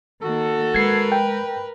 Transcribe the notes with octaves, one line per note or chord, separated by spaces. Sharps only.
D#3 A#3 F#4 A4
G#3 A#4 B4 G#6 C7
G5